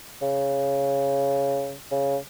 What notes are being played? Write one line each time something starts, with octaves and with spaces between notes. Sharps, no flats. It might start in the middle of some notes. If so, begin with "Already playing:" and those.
C#3
C#3